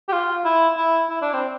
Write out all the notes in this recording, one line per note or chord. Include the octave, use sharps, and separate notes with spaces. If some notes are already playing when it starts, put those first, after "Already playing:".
G4
F4
E4
E4
E4
D4
C4